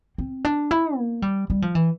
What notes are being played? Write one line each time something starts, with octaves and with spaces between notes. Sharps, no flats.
C4
D4
E4
A#3
G3
G3
F3
E3